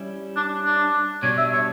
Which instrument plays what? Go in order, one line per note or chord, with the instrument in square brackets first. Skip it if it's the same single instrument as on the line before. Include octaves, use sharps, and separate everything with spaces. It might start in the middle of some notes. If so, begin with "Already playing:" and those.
Already playing: [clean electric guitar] G3 C#4 E4
[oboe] D4
D4
[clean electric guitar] B2 G3 D4 [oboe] C#5
[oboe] E5
C#5